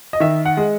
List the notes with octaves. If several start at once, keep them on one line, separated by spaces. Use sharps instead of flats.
D#5
D#3 E5
F#5
G#3